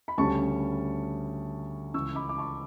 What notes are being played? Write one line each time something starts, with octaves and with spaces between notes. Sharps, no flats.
B5
D2 C#3 G3 C#4 A5 C#6
C#2 C#3 E3 C#6 E6
B5 D6
D6
A5 C#6